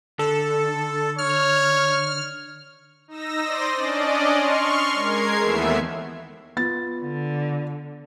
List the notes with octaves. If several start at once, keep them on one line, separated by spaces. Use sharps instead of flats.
D3 A4
C#5 F6
D#4 E6 A#6
C5 D5 C6 D#6 A#6
C#4 D4 D5 D#5
C6 C#6 F6
G#3 A#4 G#6 C7
D#2 E3 A3 B3 E5
B3 F4 A6
D3